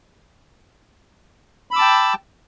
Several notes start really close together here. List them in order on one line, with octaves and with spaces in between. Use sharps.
B5 E6 D6 A5 G5